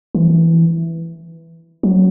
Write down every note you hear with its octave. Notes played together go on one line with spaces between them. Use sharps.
E3
F#3